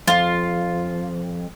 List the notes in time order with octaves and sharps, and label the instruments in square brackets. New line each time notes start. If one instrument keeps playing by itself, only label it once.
[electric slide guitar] F2 [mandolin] F4